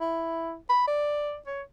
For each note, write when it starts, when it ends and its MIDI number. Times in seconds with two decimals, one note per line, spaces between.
0.01 0.56 64
0.69 0.83 83
0.88 1.38 74
1.47 1.62 73